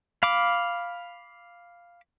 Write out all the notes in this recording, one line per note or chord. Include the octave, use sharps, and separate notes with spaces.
F5 B5 D6